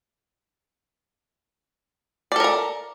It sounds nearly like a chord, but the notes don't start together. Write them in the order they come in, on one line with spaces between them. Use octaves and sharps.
D5 A4 A#4 A#5